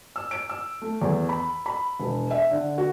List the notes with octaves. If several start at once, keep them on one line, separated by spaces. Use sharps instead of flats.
E6
D7
E6
A3
E2
B5
B5
E1
E5
D3
F#4